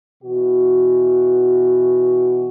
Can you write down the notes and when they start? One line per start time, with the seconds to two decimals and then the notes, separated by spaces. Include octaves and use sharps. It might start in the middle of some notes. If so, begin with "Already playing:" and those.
0.23 B2 E3 F#4